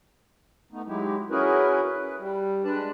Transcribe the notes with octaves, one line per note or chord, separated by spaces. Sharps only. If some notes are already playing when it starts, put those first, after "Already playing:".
A3 B3 D#4
F#3 G#3 D#4 E4 G4
C#4 E4 F#4 G#4 A#4 B4
B4
G3
G#3 D4 B4 D5 A5